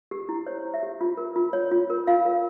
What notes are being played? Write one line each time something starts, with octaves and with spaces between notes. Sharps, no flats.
G4
E4
C5 C#5
E4
E5
G4
F4
A#4
F4
C#5
F4
A#4
F4 F5
A#4